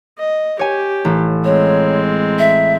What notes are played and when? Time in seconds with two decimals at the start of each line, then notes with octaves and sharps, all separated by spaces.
0.19 D#5
0.59 G4 C#5 G#5
1.05 A1
1.45 G#3 C4 C#5
2.39 E5